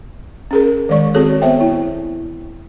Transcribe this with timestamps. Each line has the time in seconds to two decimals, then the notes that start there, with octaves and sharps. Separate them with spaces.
0.51 C#4 G#4 A#4
0.89 D#3 G#3 D5 C#6
1.14 C4 F#4 G#4 A4 C#5
1.42 B3 C5 C#5 E5 G5
1.61 E4